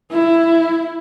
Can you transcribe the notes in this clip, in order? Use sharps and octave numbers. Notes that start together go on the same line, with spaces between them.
E4